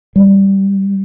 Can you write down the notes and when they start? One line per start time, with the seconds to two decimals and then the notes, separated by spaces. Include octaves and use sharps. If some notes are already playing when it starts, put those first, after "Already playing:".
0.16 G3